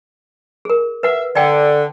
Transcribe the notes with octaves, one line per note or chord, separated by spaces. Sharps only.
G#4 A#4
B4 E5 F#5
D3 D5 G5